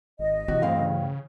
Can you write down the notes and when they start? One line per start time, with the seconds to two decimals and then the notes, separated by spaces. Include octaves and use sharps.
0.19 G#1 D#5
0.48 C3 E3 F#4
0.62 D2 G2 C4 F5
0.81 C#3